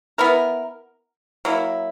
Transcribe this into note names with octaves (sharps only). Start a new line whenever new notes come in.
B3 E4 A#4
F#3 A#3 E4